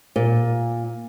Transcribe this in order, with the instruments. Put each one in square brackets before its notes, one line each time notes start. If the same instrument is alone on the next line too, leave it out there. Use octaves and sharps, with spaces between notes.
[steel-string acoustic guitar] A#2